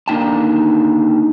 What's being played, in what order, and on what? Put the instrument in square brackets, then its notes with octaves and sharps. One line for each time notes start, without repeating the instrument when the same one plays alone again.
[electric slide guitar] D3 A#3 D4 D#4 G5 A5